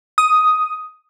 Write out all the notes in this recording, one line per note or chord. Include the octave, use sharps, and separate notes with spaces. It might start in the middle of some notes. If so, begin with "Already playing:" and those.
D#6